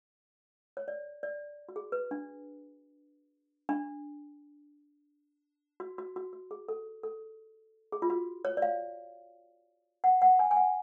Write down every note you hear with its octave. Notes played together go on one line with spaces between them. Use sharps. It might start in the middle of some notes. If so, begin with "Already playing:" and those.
C#5
D5
D5
F#4
G#4
B4
D4
D4
F#4
F#4
F#4
F#4
G#4
A4
A4
G#4
F4
F#4
C#5
D5
F5
F#5
F#5
G#5
G#5
F#5